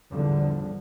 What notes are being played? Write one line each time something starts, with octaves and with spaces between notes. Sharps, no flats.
A1 E2 G#2 D3 F3 G3